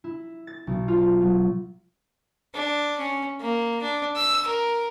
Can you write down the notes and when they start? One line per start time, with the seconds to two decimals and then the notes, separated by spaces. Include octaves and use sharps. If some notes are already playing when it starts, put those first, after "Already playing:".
0.04 E4
0.47 A6
0.67 B1
0.88 F4
1.21 F#3
2.54 D4
2.98 C#4
3.41 A#3
3.82 D4
4.16 E6
4.47 A#4